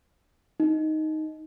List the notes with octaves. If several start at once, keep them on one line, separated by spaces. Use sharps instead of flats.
D#4